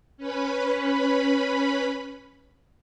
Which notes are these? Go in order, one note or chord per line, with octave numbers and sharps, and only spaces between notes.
C#4 B4 B5